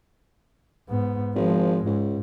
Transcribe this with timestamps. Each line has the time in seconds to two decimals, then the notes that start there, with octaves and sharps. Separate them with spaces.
0.89 G#2 B3
1.35 G#1 F3 G#3
1.85 C#2 G#2